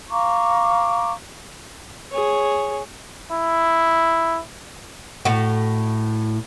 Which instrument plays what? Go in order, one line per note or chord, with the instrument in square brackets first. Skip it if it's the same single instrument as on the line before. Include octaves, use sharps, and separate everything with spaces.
[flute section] F5 A#5 C#6 D6
[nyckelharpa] G#4 C#5
[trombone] E4
[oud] A2 F#4